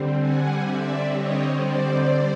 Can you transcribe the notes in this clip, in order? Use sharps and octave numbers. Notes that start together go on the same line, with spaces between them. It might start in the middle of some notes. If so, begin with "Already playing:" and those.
Already playing: D3 G3 C4
F#5 G#5
D5 E5
C#5 D#5
C5 D5
C5 D5